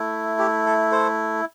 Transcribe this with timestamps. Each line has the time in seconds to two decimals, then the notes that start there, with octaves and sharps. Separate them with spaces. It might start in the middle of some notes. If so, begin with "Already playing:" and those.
Already playing: A3 E4
0.39 G4
0.66 A4
0.91 A4 C5